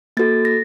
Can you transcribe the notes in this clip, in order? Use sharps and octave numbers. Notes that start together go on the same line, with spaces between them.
A#3 F#4 A4 A6
A#6